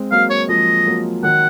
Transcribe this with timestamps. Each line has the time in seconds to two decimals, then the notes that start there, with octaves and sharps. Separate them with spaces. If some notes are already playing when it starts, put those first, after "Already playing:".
Already playing: G#3 C4
0.12 F#3 A#3 F5
0.30 C#5
0.49 F3 G#3 D#5
0.86 F#3 A#3
1.23 D#3 F#3 F#5